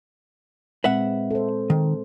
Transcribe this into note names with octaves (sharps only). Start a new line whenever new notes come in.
A#2 G#3 C4 B4 E5 F#5
A4 C5
D#3